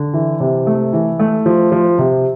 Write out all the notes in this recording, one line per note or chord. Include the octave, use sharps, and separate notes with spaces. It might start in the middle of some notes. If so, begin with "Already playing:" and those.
Already playing: D3
E3
C3
A3
E3
A3
F3
F3
C3